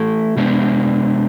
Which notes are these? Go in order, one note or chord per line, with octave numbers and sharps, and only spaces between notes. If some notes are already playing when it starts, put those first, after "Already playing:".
Already playing: E3 A3 E4 A4
C3 G#3 B3 D4